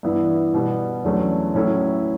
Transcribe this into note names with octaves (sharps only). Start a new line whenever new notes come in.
G2 E3 B3 E4
B2 G3 B3
E2 D3 F#3 A3 C#4
A2 F#3 C#4 E4 A4